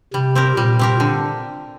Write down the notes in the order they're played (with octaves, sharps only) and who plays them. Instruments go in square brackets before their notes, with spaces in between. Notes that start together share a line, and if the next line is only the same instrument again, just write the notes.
[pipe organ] C3 [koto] G3
[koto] C4 G4 A#4
[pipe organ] A#2 [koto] G3
[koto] C4 G4 A#4
D3